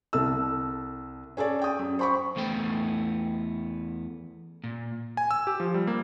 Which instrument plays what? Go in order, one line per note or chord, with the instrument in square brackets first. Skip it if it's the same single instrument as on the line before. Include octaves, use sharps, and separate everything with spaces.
[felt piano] C2 A4 E6
C#4 G#4 A4 D5
G5 D#6
F#2
C5 B5 C#6
[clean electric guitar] E2 A3 B3 G5
A#2
[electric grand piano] G#5
E6
G4
F3
G3
A#3